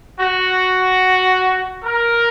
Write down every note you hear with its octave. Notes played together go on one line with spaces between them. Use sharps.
F#4
A#4